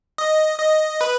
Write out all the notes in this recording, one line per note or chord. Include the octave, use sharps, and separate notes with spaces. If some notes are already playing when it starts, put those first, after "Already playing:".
D#5
D#5
B4